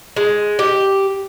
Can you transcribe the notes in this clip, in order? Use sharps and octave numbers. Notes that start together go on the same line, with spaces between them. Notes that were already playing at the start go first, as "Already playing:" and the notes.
G#3
G4